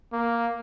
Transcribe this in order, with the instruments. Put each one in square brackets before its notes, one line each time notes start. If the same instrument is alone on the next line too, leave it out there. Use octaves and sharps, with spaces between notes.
[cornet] A#3